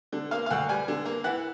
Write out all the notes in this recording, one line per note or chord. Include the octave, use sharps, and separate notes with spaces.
D3
A#3 F5
F5
D2 F#5
G3 G#5
D3
A#3
E3 F#5